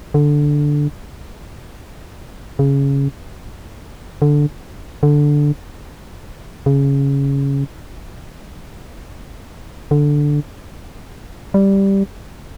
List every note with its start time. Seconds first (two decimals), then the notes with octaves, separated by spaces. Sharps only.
0.14 D3
2.59 C#3
4.22 D3
5.03 D3
6.66 C#3
9.91 D3
11.54 G3